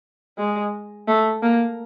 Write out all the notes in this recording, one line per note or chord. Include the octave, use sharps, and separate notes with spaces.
G#3
A3
A#3